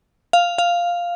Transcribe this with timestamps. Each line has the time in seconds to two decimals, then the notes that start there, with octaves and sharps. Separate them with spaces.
0.33 F5
0.58 F5